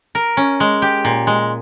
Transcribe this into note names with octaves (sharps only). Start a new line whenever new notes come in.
A#4
C#4
G#3
G4
A#2
G#3